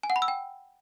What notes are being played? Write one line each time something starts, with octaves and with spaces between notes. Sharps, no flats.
G#5
F#5
B5
E6
G5